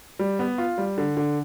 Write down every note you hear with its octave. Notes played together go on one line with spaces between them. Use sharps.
G3
B3
F4
G3
D3
D3